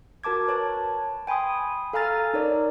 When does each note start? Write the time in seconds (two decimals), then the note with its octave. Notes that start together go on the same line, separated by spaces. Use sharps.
0.24 F#4 A#4 A5 D6 G#6
0.48 B4 C#5 A5
1.27 G5 G#5 B5 C6 D#6
1.93 A4 F5 G#5 A#5 F6 A6
2.34 D#4 A#4 C#5 D5